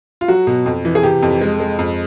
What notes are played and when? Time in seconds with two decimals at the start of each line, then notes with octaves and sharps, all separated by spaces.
0.21 F4
0.28 F#3 F#4
0.47 B2
0.66 F2
0.85 E3
0.95 G#4
1.03 C3 G4
1.22 F2
1.41 G#3
1.60 G#3
1.79 F2